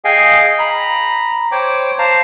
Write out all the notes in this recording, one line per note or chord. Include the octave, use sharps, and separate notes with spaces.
G#4 D#5 F5 G5 G#5
A#5 B5
C5 C#5 G5 D6
C5 F5 A5 A#5